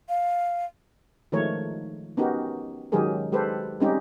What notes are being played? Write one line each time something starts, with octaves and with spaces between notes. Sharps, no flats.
F5
D#3 F3 G#3 A3 A#4 C#5
B3 C#4 D#4 F#4 G4 A#4
D#3 F#3 G#3 G4 G#4 A#4
G#3 G4 A4 B4 C5
G3 G#3 C4 C#4 D#4 G4